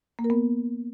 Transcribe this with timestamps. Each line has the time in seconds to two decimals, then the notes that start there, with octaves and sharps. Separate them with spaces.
0.19 A#3
0.24 A#4
0.30 B3